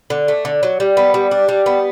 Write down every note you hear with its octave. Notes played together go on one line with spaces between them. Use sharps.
D3
A3
D3
F#3
G3
B3
G3
D4
G3
B3